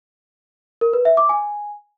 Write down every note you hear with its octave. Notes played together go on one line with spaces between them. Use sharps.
A#4
B4
E5
D6
G#5